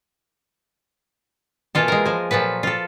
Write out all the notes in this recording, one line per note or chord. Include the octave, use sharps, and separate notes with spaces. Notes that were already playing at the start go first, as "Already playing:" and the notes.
B2 E3 A#3 F4 A4
G#3 A#4
F3 G#5
A#2 F3 F#3 A4 B4
F4 A4